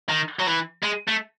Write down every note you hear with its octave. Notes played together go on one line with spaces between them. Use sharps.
D#3
F#3
E3
G#3
A3